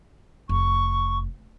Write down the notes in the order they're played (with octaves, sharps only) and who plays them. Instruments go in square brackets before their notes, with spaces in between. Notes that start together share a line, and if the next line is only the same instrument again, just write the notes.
[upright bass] F1 [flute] C#6